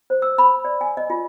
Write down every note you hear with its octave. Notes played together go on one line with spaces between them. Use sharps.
C5
E6
B5
D5
G#5
D#5
F4